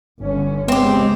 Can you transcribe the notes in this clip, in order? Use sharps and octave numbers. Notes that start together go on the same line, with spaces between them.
G1 D3 C#4
C#3 G#3 B3 C4 G4